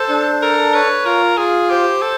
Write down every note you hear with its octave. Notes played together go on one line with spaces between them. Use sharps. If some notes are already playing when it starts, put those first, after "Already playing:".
Already playing: A4 C5
D4
A4 A#4
B4 C#5
F4 A#4
F4 G#4
G4 C5
A4